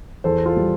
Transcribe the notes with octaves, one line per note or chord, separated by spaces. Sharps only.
E2 A4 C5
F4 A4
G3